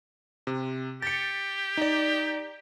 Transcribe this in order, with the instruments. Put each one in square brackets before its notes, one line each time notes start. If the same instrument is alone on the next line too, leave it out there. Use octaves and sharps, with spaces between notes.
[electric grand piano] C3
[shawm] G4 [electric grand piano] A6 C#7
[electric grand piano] D#4 D5